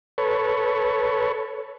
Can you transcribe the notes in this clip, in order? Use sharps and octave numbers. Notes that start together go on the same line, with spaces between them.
A4 B4 C#5